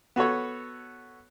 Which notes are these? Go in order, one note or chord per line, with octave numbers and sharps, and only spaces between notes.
B3 F#4 A4 C#5